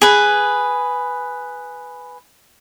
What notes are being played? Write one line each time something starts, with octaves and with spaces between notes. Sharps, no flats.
G#4 B4